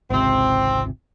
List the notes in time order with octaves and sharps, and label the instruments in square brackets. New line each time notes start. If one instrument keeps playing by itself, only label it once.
[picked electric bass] G#1 C#2 C3 [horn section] C4